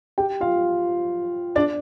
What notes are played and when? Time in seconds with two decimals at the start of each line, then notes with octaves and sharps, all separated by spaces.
0.18 G4 G5
0.40 F4 F5
1.56 D4 D5